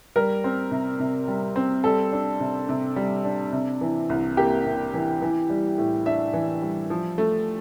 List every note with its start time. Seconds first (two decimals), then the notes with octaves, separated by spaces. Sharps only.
0.16 G3 A#4
0.44 C4
0.71 C3
0.99 C3
1.28 G3
1.56 C4
1.84 G3 A4
2.12 D4
2.40 C3
2.69 C3
2.96 G3
3.25 D4
3.52 C3
3.81 E3
4.09 C2
4.37 A#3 G4
4.65 C3
4.94 E3
5.22 E3
5.50 G3
5.78 A2
6.06 D4 E5
6.33 E3
6.62 G3
6.90 F3
7.18 A3